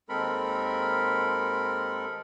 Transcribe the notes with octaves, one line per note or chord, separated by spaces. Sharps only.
D#2 G#3 C4 A4 A#4 B5